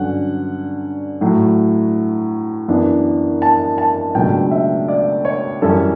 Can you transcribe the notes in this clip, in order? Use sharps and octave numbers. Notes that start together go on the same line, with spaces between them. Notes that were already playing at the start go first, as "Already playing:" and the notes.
Already playing: G2 D3 F#3 C#4 F#5
A2 F#3 A3
F#2 E3 B3 D4
A5
A5
C#2 B2 F#3 A3 D4 G5
E5
D5
C#5
F#2 E3 G3 C#4 A4